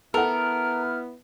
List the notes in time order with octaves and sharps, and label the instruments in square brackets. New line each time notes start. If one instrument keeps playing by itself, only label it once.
[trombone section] B3 E4 [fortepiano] A4 F#5 [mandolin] A#4 [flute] F6